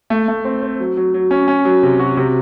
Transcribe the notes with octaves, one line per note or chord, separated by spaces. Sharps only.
A3
A3
C4
C4
F#3
F#3
F#3
C#4
C#4
F#3
C3
F#4
C3